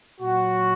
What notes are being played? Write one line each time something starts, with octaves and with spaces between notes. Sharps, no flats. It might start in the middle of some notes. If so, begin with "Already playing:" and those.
A#2 F#3 F#4